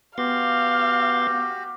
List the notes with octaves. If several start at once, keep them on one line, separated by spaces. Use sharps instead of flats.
B3 F#4 G4 F5 C6 A6